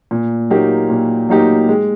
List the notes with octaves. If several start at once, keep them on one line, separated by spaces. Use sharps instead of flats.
A#2
F#3 A#3 D#4 G4
A#2
F#3 A#3 D#4 G4
G#3